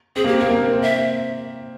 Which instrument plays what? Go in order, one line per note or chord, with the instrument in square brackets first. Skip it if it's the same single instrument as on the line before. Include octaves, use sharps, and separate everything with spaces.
[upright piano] C4 [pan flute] G#4
[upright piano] A#3
[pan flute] G4
[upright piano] C4
[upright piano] A#3 [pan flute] A#4
[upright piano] A#3
C4
C4
[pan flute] E5